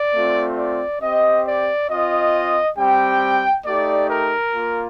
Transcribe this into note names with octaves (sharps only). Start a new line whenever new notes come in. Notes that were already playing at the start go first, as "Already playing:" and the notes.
Already playing: D5
A3 C4 F4
D5
C4 G4 D#5
D5
C4 F4 D#5
G3 C4 G4 G5
A3 D#4 G4 D5
A#4
A#3 F4